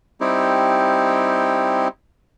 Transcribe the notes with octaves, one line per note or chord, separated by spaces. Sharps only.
G3 C4 D#4 E4 G4